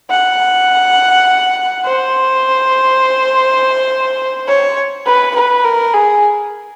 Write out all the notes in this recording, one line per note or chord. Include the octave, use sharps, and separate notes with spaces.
F#5
C5
C#5
B4
B4
A#4
G#4